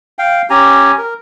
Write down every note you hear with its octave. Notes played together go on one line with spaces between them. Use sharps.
F5 G5
C#4 G4 G#5 A#5
A#4